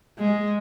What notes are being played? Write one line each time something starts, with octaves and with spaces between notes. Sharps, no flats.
G#3